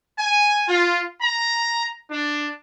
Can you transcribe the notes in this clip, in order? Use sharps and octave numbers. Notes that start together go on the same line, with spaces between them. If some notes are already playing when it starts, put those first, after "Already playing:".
G#5
F4
A#5
D4